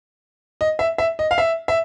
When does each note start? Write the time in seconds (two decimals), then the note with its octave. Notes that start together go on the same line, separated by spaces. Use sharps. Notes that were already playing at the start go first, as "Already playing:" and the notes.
0.61 D#5
0.79 E5
0.98 E5
1.19 D#5
1.31 F5
1.38 E5
1.68 E5